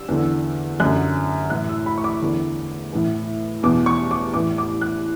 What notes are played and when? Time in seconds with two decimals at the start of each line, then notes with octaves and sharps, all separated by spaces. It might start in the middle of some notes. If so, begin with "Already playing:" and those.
Already playing: E6
0.08 E2 D3
0.80 F#2 D3 F#6
1.50 A2 E3 F#6
1.69 E6
1.86 B5
1.98 C#6
2.04 D6
2.22 E2 D3
2.93 A2 E3
3.63 E2 B2 D6
3.86 C#6
4.11 D6
4.34 A2 E3 D6
4.58 D6
4.81 F#6